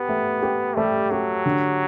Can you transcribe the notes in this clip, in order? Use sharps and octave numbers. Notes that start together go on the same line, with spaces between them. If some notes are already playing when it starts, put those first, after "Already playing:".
Already playing: B3 G4
A3
G4
G3 A3
F#3 G4
D3